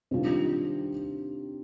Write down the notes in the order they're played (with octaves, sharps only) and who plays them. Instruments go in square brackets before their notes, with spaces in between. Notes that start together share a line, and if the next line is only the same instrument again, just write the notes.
[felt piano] C3 D#3 G3 D4 F4